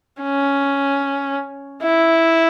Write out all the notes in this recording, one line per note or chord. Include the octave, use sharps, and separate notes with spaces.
C#4
E4